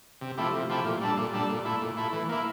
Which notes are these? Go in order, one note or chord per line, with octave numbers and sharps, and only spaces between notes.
C3
F3 A3 E4 G4
C3
F3 A3 E4 G4
A#2
G3 D4 A4
A#2
G3 D4 A4
A#2
A3 E4
A#2
A3 E4
E3
A#3 E4